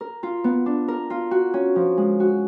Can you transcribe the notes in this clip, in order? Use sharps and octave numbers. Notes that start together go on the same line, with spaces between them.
A#4
F4
B3
D4
A#4
F4
F#4
C#4
F3
G#3
F#4